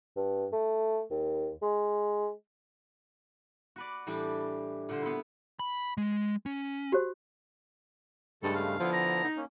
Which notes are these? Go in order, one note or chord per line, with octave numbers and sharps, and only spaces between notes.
G2
A3
D#2
G#3
F#4 B4 D5
A2 E3 G3 D4 G4
A#2 D3 C5
B3 E4
B5
G#3
C#4
F#4 G4 C5
G2 C#3 G#3 A3 A4
F5
D3 F3 B3 E4
A#5
D#4
A#3 C#4